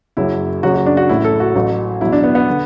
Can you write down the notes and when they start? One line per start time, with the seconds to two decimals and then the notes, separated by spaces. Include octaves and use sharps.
0.17 F#1 F#2 F#3 E4
0.63 F#1 F#2 F#3 F#4
0.74 F#4
0.86 D4
0.97 F#4
1.09 A1 A2 F#3 E4
1.24 A4
1.40 F#4
1.55 A1 A2 F#3
2.01 E2 B2 F#3 E4
2.12 D4
2.24 B3
2.35 B3
2.50 D3